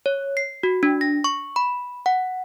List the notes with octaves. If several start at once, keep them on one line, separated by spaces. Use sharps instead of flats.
C#5
C7
F#4
D4
A#6
C#6
B5
F#5